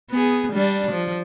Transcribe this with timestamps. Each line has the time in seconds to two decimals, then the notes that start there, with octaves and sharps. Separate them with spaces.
0.10 B3 G#4
0.53 G3 D4
0.92 F3